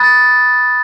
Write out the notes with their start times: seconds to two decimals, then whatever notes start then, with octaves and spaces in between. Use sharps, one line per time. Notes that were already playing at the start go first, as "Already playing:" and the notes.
Already playing: B5 D#6 F#6 A6